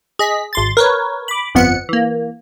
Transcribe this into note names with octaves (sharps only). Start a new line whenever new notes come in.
G#4 D#5 B6
G#1 C6 A6
A#4 B4 C#5
B5 D6
G1 F2 F3 B3 F#5 C#7
E3 A#3